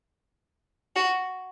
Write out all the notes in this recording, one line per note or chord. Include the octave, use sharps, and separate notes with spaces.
F#4